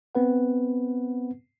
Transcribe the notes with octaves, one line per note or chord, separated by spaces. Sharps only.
B3 C4 B4 F#5